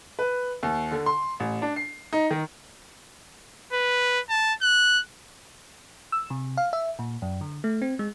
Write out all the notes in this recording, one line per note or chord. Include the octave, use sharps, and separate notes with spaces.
B4
D#2
D3
C6
A1
D4
C7
D#4
D#3
B4
A5
F#6
E6
C3
F5
E5
A#2
F#2
D3
A3
C4
G#3